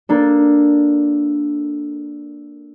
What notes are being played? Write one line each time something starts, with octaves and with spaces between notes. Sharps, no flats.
A#3 D4 A4